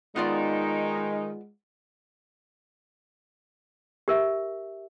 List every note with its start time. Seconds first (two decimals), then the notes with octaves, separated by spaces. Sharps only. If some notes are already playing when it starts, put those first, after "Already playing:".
0.16 D#3 G#3 B3 D#4 F4 D5
4.08 G4 A#4 E5